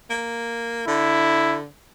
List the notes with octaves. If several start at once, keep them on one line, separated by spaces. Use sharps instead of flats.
A#3
D3 E4